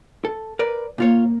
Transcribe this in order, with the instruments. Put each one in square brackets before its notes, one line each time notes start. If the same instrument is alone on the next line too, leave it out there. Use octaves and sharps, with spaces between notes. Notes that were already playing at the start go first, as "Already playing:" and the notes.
[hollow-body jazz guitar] A4
A#4 B4 D5
[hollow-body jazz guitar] A#2 F4 C#5 [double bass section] A#3